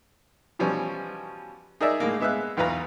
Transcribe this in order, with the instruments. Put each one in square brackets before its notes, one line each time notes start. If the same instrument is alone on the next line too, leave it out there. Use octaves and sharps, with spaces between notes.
[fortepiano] B2 E3 F3 G3 C#4
D#4 G#4 A#4 D5 E5
A2 G#3 A#3
G#3 B3 E5 F5 F#6
B1 E2 F4 B4 A#5